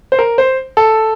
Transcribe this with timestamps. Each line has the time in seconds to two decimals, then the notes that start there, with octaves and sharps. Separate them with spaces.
0.12 C5
0.19 A#4
0.38 C5
0.77 A4